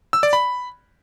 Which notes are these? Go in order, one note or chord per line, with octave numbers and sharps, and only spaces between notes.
E6
D5
B5